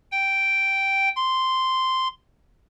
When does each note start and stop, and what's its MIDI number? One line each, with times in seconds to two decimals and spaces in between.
0.11 1.09 79
1.16 2.08 84